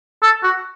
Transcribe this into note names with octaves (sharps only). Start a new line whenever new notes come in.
A4
F#4